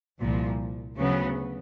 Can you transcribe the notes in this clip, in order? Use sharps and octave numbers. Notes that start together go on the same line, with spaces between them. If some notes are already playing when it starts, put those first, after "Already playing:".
C2 A#2 F3
D2 C#3 F#3 B3